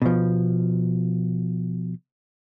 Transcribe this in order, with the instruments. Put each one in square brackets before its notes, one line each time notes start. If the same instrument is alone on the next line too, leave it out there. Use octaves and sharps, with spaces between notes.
[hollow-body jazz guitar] B2 F3